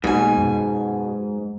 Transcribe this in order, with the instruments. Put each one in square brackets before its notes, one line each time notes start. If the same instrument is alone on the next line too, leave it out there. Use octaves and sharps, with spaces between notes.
[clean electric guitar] G#2 [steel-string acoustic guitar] B2 G#5 [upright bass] A#3
[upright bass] F#2